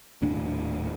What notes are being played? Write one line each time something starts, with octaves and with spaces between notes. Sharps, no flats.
D#1 D#2 A2 D4